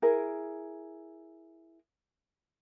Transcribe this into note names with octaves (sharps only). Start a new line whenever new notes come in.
E4 G#4 A#4